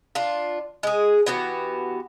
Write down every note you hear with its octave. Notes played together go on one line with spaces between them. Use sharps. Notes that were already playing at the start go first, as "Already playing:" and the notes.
D4 F4
G#3 G#4
E3 B3 F#4 G4